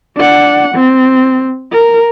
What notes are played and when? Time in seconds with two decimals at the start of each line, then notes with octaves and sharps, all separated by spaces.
0.17 D4 F#5
0.74 C4
1.72 A#4